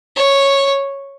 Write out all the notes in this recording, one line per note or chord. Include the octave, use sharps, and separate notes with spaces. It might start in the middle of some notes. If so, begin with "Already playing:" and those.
C#5